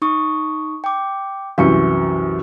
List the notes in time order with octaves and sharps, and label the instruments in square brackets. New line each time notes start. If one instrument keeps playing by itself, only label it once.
[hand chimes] D#4 C#6 D#6
G5 D6
[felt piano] C2 F#2 E3 [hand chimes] F#4 C#6 C#7